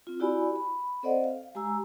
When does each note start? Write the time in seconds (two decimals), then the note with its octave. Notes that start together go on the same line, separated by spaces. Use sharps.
0.07 C4 F4
0.20 E4 F#4 G4 D5 G#5 B5
0.56 B5
1.03 C4 A4 C5 D5 D#5 F#5
1.24 F5
1.55 G#3 G4 G#5 A#5 E6